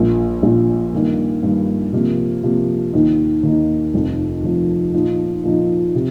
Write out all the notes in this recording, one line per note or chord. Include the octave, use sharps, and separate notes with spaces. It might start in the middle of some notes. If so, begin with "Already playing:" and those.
Already playing: A#1 A#2 A#3
A#1 A#2 A#3
G2 D#3 A#3
G2 D#3 A#3
C3 F3 A#3
C3 F3 A#3
D#2 D#3 A#3 D#4
D#2 D#3 A#3 D#4
F1 F2 F3
F1 F2 F3
A#2 F3 D#4
A#2 F3 D#4
C3